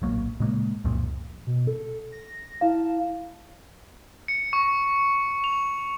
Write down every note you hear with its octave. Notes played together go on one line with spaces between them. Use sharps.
D1 A#1 F#3 A#3
A#2 C#3 G#3 A#3
C#2 F#2 A#2 F3
B2
A4
A#6
E4 F5 A5
C#7
C#6
F7